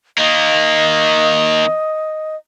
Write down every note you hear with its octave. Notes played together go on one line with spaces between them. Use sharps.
D#3 A#3 D#5